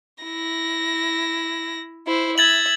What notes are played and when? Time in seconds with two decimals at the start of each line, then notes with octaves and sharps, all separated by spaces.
0.24 E4 A#6
2.07 E4 C5
2.38 E5 G#6 A6 F#7